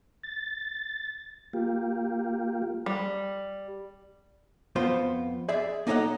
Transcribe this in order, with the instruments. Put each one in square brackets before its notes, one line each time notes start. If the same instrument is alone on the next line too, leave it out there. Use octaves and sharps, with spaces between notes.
[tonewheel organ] A6
A#3 F4 G4
[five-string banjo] G3
[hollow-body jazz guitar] F2 B3 F4 C5
G#4 D5 E5
A#3 D#4 A4 C#5 D#5 F#5